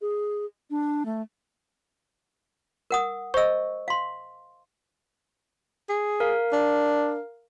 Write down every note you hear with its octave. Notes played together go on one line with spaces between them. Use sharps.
G#4
D4
A3
A#4 F#5 D#6
C5 D#5 C#6 E6
F5 C6
G#4
A#4 F5
D4